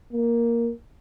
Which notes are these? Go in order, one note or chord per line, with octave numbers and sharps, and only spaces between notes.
A#3